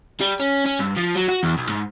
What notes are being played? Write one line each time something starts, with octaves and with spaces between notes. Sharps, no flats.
G3
C#4
C#4
G2
F3
F#3
F#4
E2
B1
G#2